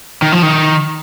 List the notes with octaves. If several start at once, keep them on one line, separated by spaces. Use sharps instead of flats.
D#3
F3
D#3